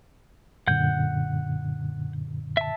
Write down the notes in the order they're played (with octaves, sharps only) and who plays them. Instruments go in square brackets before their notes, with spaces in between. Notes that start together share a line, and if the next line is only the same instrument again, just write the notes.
[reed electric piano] F#2 A#2 D3 [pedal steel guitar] F#5 G6
[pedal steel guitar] E5 A5